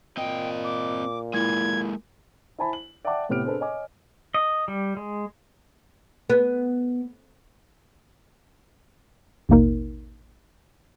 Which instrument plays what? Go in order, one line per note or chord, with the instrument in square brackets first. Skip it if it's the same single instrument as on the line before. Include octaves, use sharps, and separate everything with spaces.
[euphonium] A#2 [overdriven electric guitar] C4 D#5 [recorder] G5
[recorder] D6
[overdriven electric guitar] G#3 A#3 [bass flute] E4 [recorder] G#6
[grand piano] E4 C5 G#5 A5 B5
F#7
D5 E5 F#5 G5 A5 D6
A2 C3 B3 G4 F6 D7
C4 D4 G#4 A4 B4
C#5 D#5 G#5 D6
[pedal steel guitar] D#5
G3
G#3
[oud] B3
[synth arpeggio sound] A1 D#2 B2 A#3 D#4 A#4